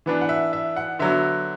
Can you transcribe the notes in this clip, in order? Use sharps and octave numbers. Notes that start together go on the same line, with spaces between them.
E3 B3 D4
F#5
E5
E5
F#5
D3 F#3 B3 E5